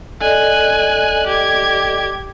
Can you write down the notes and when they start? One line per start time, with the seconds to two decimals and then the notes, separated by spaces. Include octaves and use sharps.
0.21 A4 D5 D#5 G#5 F#6
1.27 G4 G#6